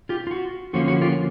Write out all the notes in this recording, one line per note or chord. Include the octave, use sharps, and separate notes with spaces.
F4 G4
F4
F#4
D3 F3 A#3 C#4 F4 F#4
F#4
F4 G4